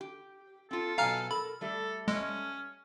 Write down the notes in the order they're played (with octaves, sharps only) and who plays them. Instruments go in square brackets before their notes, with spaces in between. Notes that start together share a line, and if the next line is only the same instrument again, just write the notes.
[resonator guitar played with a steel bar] G4
[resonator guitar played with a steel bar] C4 F4 [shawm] A4
[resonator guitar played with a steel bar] B2 F#3 G#5 [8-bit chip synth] F5 A#5 F6
[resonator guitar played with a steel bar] A4 A#4 [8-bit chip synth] B5
[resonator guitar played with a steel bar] G3 A3 G4 [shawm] A4
[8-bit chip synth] G#3 [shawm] C#4